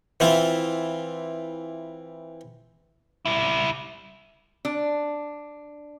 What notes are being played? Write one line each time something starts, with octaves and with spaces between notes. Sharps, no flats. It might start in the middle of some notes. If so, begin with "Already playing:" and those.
E3 C4 E4 F4
G3 E4
D4